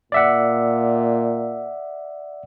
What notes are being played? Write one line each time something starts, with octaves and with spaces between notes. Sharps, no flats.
A#2 D5 E5 F#5